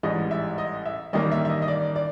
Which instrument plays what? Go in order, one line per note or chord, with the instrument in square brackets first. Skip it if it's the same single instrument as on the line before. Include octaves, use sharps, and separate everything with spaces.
[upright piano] A1 G#2 E3 G3 D#5
E5
D#5
E5
A1 G2 D#3 G3 A#3 D#5
E5
E5
D#5
D#5
D5
D5